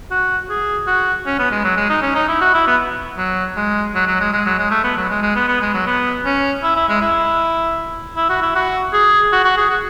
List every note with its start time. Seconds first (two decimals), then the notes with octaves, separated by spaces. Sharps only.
0.11 F#4
0.50 G#4
0.87 F#4
1.26 C#4
1.39 B3
1.51 G#3
1.64 F#3
1.77 G#3
1.89 D#4
2.02 C#4
2.15 D#4
2.28 E4
2.41 F#4
2.54 E4
2.67 B3
3.17 F#3
3.56 G#3
3.94 F#3
4.07 F#3
4.20 G#3
4.33 G#3
4.46 F#3
4.58 G#3
4.71 A3
4.84 B3
4.97 F#3
5.10 G#3
5.22 G#3
5.35 B3
5.48 B3
5.61 G#3
5.74 F#3
5.87 B3
6.25 C#4
6.63 E4
6.76 E4
6.89 G#3
7.01 E4
8.16 E4
8.29 F#4
8.42 E4
8.55 F#4
8.93 G#4
9.32 F#4
9.44 F#4
9.57 G#4
9.70 F#4